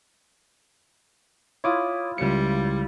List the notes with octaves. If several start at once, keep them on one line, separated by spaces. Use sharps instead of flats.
E4 F4 C#5 D6 D#6
C#2 G3 C#7